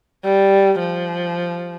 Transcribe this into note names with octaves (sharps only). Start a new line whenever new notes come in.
G3
F3